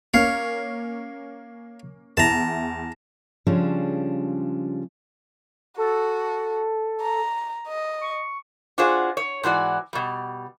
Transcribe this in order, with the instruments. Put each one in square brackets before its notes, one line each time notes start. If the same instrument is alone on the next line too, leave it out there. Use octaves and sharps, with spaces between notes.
[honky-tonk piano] A#3 C#4 [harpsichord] C#5 F5
[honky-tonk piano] E2 E4 [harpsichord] A5 A#5
[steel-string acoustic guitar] C#3 F3 G3 G#3 C#4 D4
[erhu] F#4 [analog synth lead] A4
[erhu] A#5
D#5
[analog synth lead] C#6
[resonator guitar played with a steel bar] D4 F4 F#4 G#4 C5
C#5
G#2 E3 F#4 D5
B2 G3